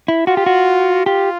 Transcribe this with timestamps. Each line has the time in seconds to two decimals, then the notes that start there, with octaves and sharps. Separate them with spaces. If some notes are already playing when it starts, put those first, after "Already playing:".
0.08 E4
0.27 F4 F#4
0.37 G4
0.46 F#4
1.06 F4 G4